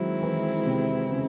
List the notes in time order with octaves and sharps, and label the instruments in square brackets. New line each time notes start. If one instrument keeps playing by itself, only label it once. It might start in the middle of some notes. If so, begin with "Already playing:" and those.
Already playing: [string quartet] D#3 G#3 C4 E4 [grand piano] F#3
[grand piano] E3
C3
C#3